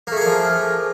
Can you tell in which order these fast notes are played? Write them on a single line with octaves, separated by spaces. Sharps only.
A#3 A3 G#4 A#4 F3